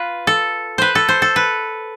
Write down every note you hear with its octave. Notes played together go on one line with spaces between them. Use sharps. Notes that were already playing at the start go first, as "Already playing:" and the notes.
Already playing: F4 B4
A4
B4 C5
A4
C5
A4
B4